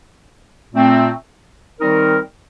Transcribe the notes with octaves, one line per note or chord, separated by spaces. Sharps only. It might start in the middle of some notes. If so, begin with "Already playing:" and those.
A#2 A3 C4
D#3 G3 C4 D#4 A#4